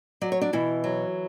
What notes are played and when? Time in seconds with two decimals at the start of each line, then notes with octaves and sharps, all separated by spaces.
0.21 F#3 D5
0.32 C#5
0.41 D4 D5
0.53 B2 E3 E4
0.84 F#3